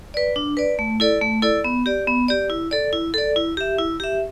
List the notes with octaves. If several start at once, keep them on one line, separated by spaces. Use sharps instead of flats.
B4 D5
D4
B4 D5
A3
E4 A4 D5
A3
E4 A4 D5
B3
G4 D5
B3
G4 D5
E4
A4 D5
E4
A4 D5
E4
G4 E5
E4
G4 E5